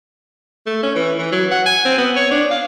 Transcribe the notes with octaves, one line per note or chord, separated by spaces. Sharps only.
A3
C#4
E3
E3
F#3
F#5
G#5
C4
B3
C#5
D4
F5